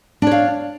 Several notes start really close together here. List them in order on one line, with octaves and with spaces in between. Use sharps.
D4 C#5 F5